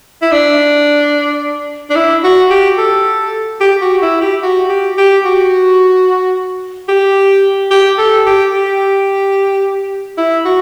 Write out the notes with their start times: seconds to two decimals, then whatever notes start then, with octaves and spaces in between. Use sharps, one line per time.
0.22 E4
0.32 D4
1.90 D4
1.96 E4
2.24 F#4
2.50 G4
2.78 A4
3.61 G4
3.82 F#4
4.02 E4
4.22 G4
4.43 F#4
4.70 G4
4.98 G4
5.25 F#4
6.89 G4
7.71 G4
7.99 A4
8.26 G4
8.54 G4
10.18 E4
10.45 F#4